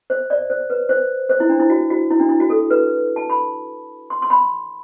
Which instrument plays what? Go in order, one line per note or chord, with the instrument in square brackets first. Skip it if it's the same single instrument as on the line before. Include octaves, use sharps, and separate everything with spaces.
[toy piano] C5
D5
C5
B4
C5
C5
E4
D4
E4
F#4
F#4
E4
D4
E4
F#4
A4
B4
A5
B5
C6
C6
B5